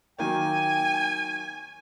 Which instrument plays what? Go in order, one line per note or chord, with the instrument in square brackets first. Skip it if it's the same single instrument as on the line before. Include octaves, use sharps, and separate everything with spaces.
[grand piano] D#3 F#3 A#3 [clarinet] G5 [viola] G#5